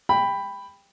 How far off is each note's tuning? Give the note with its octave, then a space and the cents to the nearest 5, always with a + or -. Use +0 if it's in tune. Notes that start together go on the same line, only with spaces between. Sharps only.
G5 +15 B5 +5